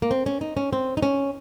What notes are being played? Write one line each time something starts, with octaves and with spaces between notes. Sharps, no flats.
A#3
C4
C#4
D#4
C#4
C4
D#4
C#4